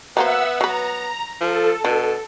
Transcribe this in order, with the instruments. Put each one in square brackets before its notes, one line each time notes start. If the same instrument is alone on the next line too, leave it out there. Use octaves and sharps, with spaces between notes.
[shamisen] F#3 A#3 C5 [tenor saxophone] B3 [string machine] E5 F#5 E6
[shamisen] F#3 B4 [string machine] A#5
[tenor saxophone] F3 [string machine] A4
[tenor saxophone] B2 [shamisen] D4